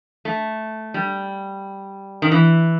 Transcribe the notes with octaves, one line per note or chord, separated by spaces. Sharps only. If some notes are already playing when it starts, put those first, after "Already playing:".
A3
G3
D#3
E3